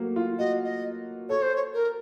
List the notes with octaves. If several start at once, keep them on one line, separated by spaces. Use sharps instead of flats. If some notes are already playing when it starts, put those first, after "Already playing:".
Already playing: F#3 A3 A#3
F4
F#4 D#5
D#5
A4 C#5
C5
C#5
A#4